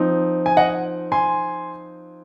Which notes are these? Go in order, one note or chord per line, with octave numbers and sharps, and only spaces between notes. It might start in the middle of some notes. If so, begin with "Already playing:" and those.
Already playing: F3 C4 D#4
G#5
D#5 F#5
G#5 C6